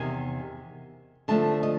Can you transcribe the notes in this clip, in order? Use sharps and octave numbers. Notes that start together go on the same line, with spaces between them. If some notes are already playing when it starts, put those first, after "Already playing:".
Already playing: E2 C3 D#3 G#5
D3 F3 A3 D4 A5
D#5